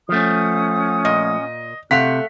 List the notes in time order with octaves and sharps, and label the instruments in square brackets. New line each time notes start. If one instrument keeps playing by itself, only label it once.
[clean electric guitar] F3 A3 [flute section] C#4 F#5 D#6
[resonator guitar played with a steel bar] A#2 [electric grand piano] D#5
[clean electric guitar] C3 [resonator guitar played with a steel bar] A3 F5 F#5 [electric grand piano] B6